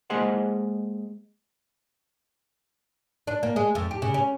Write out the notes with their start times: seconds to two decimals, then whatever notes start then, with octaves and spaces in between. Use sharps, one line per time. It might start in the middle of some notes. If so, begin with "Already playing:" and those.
0.10 G#3 A#3 G#4 C5 D#5 F#5
3.27 D4
3.43 A#3
3.56 G#3
3.75 F2
3.91 G4
4.02 C#3
4.14 C#4